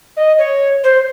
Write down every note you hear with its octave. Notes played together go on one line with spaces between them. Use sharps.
D#5
C#5
C5